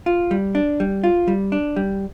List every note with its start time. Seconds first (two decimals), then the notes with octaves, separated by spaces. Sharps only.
0.06 F4
0.31 G3
0.55 D4
0.80 G3
1.04 F4
1.28 G3
1.52 D4
1.76 G3